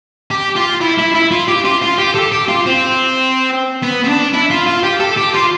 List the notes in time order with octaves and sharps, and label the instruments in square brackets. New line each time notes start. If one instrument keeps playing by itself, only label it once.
[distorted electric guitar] G4
F4
E4
E4
E4
F4
G4
F4
F4
G4
A4
G4
F4
C4
B3
C4
D4
E4
F4
F4
G4
A4
G4
F4